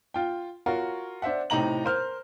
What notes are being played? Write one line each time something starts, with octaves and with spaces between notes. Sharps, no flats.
F4 G5
F4 F#4 A#4 C#5
D4 C5 E5 F#5
A2 C3 D#4 A#5 F#7
A#4 C5 F6